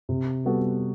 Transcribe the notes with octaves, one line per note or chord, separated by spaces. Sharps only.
C3
G3 B3 F#4 A4